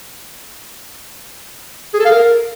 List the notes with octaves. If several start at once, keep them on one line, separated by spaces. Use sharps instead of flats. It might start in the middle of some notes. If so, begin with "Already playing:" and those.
G#4
A4
F5
A#4